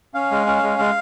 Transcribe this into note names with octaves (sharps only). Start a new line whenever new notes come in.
C#4 F5
G#3
C#4
G#3
G#3